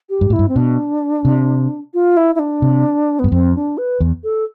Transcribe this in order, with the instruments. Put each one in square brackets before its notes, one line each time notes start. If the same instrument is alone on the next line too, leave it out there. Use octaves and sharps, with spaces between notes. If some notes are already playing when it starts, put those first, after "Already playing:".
[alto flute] G4
[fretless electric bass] G2
[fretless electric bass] A2 [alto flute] E4
[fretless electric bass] G2
[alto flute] C4
[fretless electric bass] B2 [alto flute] D4
[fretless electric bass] C3
[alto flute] F4
E4
E4
D4
[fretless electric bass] C3
[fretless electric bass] G2 [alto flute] B3
[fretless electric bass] F2 [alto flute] C4
[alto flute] D4
B4
[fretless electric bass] E2
[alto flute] A4